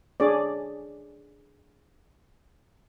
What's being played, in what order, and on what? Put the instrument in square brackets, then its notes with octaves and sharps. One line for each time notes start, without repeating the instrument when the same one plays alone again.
[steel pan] D4 G#4 C#5 D5